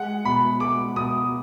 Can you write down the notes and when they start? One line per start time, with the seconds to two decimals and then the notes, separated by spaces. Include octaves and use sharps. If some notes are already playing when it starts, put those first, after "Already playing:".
Already playing: G#3 F#5
0.25 B2 B5
0.60 G#3 D6
0.96 B2 D#6